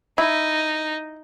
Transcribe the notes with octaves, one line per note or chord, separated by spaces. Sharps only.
D#4 E4